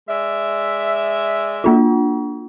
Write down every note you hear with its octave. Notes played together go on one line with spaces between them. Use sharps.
G#3 D5 E5
A#3 D4 F4